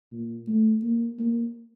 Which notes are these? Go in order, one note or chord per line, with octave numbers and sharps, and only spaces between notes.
A#2
A3
A#3
A#3